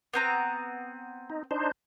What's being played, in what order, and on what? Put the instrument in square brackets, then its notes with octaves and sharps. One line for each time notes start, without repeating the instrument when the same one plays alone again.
[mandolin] B3 C4 A#5
[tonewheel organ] D#4
D4 D#4 C5